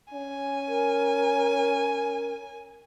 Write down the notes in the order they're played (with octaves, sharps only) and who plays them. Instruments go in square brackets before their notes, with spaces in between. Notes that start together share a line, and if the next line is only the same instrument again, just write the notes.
[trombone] C#4 [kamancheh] G#5
[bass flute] A#4